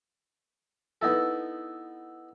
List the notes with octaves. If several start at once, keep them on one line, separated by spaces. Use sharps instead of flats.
B3 D#4 E4 A4